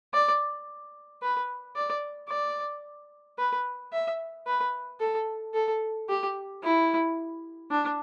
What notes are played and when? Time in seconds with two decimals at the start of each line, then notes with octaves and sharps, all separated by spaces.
0.14 D5
1.22 B4
1.76 D5
2.29 D5
3.39 B4
3.93 E5
4.47 B4
5.00 A4
5.54 A4
6.09 G4
6.63 E4
7.71 D4